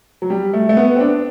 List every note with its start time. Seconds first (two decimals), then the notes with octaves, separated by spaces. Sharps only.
0.22 F#3
0.30 G3
0.53 A3
0.69 A3
0.77 B3
0.96 C4
1.00 D4